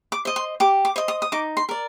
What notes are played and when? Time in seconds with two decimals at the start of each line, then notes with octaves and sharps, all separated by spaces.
0.12 D6
0.25 C5 D#5
0.36 C6
0.60 G4 D6
0.85 D6
0.96 C5 D#5
1.08 D#6
1.22 D#6
1.32 D#4 D6
1.57 C6
1.69 A#4 D5